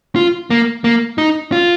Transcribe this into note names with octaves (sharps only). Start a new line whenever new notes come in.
F4
A#3
A#3
D#4
F4